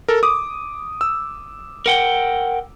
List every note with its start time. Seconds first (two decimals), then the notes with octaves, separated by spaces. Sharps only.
0.08 A4 A#4
0.23 D6 D#6
1.01 E6
1.86 A#4 F#5 G5